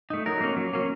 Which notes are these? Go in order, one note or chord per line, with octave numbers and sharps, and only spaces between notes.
A3 D#4
F#3 A#4
A#3 C#4
F#3
A#3 C#4